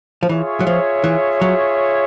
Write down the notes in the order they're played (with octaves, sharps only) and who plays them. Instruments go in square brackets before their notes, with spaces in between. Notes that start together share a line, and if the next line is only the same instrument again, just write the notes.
[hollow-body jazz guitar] F3
[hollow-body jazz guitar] E3 [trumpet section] F4 G#4 C#5 E5
[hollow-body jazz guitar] F#3
F3
E3
F#3